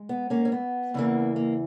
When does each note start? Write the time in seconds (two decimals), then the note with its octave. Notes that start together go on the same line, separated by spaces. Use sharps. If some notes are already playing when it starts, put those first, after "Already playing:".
Already playing: G#3
0.09 B3
0.30 A#3 C#4
0.45 C#4
0.52 B3
0.94 E2 C#3 E3 A#3
1.36 A#3